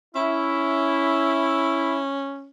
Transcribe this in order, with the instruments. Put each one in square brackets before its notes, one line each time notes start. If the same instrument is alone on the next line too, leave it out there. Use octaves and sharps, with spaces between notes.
[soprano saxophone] C#4 [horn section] E4